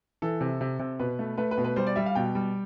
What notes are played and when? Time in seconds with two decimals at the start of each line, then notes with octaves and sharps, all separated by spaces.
0.22 E3 A4
0.41 C3
0.61 C3
0.79 C3
0.99 B2 B4
1.19 A3
1.38 A3 B4
1.51 B4
1.58 B2
1.64 B4
1.76 G3 C5
1.87 D5
1.96 G3 E5
2.06 F5
2.15 B2 G5
2.35 G3